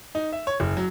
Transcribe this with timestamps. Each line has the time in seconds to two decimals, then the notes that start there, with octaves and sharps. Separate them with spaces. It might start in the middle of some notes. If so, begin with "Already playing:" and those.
0.15 D#4
0.33 E5
0.47 C#5
0.60 F#1
0.77 F#3